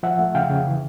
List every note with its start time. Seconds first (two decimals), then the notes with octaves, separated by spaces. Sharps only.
0.03 F3 E5 F#5
0.19 A3
0.35 C#3 F5 G5
0.50 C#3
0.67 E3